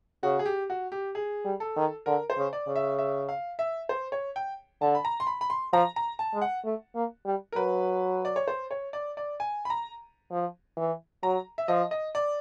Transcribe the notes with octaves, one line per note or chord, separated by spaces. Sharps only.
C#3 F#4
G#4
G4
F#4
G4
G#4
G3
A4
D#3
D3 A#4
C5
C#3
D5
C#3
E5
E5
F5
E5
C5
C#5
G5
D3 A5
B5
A#5
C6
B5
B5
C6
F3 A#5
A#5
A5
G#3
F#5
A3
A#3
G3
A#4
F#3 B4
D5
C#5
C5
C#5
D5
D5
G#5
B5
A#5
F3
E3
F#3 A#5
E5
F3 D#5
D#5
D5